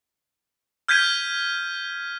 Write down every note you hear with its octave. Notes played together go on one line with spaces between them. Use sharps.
F6 G6 G#6 B6 D#7